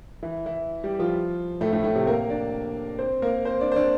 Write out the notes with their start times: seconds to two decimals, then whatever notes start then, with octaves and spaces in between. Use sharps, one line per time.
0.23 E3 E4
0.46 E3 E4
0.84 G3 G4
0.99 F3 F4
1.61 A2 A3
1.73 A2 A3
1.84 A2 A3
1.95 C3 C4
2.07 A#3 A#4
2.30 D4 D5
2.99 C4 C5
3.22 A#3 A#4
3.45 C4 C5
3.60 D4 D5
3.72 C5
3.76 D4 D5